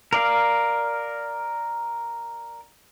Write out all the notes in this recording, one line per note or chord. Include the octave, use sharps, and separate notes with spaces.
A#4 D5 F5